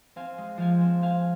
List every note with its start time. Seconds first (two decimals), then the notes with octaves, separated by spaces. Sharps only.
0.16 C4 F5 G#5
0.38 G#3
0.57 F3 F5 G#5
0.81 C4
1.02 C4 F5 G#5